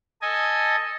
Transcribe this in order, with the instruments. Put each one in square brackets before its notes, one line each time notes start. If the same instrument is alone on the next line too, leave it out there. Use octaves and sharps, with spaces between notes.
[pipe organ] A4 D#5 G#5